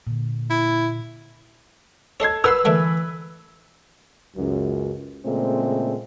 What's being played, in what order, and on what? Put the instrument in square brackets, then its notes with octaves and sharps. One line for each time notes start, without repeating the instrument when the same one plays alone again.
[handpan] A#2 D3
[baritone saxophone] E4
[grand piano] A4 G#6 [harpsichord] C#5 D#5 C6
[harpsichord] A#4 F#5 C6 [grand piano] B4 [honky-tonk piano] E6
[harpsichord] D3 A3 A#3 [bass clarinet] E3
[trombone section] C#2 F#2
A#2 C#3 G#3 A3 C4